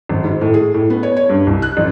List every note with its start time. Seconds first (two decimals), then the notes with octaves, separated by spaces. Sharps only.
0.09 G#1
0.24 G#2
0.41 A2
0.54 G#4
0.74 A2
0.90 B3
1.03 C#5
1.17 C#5
1.29 G2
1.47 C2
1.62 F#6
1.77 A1